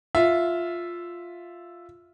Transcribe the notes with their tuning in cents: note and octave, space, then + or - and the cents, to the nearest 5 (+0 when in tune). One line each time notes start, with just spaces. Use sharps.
F4 +0 E5 +0